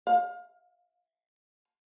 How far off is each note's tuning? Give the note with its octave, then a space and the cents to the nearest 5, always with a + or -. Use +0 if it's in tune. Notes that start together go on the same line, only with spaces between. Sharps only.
F5 +25